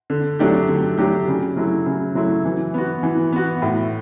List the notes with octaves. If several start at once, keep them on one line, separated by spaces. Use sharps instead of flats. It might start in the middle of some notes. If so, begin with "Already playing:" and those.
D3
F#3 A3 D4 G4
D3
F#3 A3 D4 G4
C#3
F#3 A3 E4
C#3
F#3 A3 E4
E3
B3 F#4
E3
B3 F#4
A2